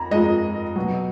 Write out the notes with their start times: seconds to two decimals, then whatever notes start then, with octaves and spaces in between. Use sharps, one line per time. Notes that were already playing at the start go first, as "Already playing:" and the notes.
Already playing: F2 A#5
0.11 F2 F3 G#3 D#5
0.76 B2 F#3